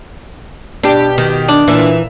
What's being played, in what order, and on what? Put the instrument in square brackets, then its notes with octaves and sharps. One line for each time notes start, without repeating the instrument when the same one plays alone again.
[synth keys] B2 G4 [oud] D4
[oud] D#3
[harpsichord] D4
[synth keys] A#2 E5 [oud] E3